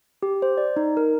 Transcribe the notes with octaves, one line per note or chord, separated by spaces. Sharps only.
G4
C5
D5
D#4
A#4